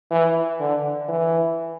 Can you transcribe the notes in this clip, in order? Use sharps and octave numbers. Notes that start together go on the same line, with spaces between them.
E3
D3
E3